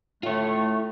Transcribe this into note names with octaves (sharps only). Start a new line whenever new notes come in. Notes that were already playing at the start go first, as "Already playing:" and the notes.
A2 A3 F4 C#5